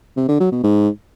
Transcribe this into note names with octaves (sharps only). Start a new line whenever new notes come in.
C3
D3
F#3
B2
G#2